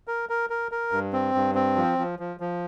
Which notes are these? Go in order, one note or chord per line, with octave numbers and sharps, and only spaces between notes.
A#4
A#4
A#4
A#4
G2
C4
G2
C4
F3
F3
F3
F3